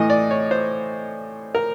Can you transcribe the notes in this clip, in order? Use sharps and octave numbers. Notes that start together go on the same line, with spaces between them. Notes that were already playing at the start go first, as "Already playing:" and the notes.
Already playing: A2 E3 D#5
D5
C#5
C5
A#4